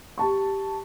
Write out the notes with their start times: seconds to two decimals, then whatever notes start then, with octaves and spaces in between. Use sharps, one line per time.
0.18 G4 A5 C#6